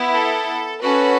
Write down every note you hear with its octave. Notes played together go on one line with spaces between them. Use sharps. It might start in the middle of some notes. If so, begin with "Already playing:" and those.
Already playing: B3 E4
A4
C#4 F#4 A4 B4